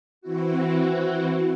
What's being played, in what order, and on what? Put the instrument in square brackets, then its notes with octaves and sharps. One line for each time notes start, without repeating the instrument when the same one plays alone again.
[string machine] E3 C4 E4 F#4